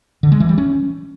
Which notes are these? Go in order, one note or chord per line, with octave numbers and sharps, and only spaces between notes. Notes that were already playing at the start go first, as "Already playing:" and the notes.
D3
G#3
E3
G3
C#4